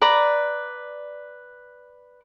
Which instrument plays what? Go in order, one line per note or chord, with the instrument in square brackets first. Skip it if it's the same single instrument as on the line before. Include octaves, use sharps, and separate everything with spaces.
[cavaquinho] B4 D5 A#5